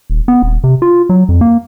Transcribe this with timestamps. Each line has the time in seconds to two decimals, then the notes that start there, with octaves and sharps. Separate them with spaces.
0.10 D#1
0.28 B3
0.42 D#1
0.64 C3
0.82 F4
1.09 F#3
1.29 F2
1.41 A#3